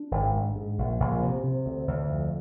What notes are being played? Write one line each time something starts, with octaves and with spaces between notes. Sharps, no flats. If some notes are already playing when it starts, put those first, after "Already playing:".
Already playing: D4
G#1
G#2
G#2
A#1
A#1
C3
C3
D2
D2
F2